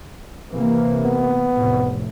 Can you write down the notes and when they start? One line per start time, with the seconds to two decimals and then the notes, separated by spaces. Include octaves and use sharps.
0.52 C3 E3 A#3
1.05 B3
1.54 F1 A2